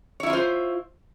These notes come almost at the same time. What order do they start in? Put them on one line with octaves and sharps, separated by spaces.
C#5 E4 E5 F4 C5